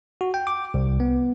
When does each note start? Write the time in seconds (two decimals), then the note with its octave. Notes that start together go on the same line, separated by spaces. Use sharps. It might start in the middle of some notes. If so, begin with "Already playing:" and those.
0.21 F#4
0.34 G5
0.47 D6
0.74 C2
1.00 B3